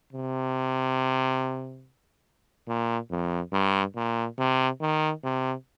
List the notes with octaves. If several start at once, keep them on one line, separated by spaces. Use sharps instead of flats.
C3
A#2
F2
G2
A#2
C3
D#3
C3